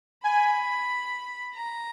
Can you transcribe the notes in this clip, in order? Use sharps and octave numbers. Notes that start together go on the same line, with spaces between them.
G#5 B5
A#5